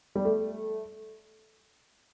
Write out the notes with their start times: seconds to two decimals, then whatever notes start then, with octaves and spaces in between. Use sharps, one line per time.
0.15 G3
0.25 A3